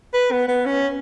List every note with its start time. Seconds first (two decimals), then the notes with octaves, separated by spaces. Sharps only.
0.14 B4
0.32 B3
0.48 B3
0.66 C#4